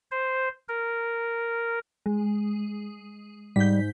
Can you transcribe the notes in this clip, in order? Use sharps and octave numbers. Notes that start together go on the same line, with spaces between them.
C5
A#4
G#3
G#2 G3 G6 B6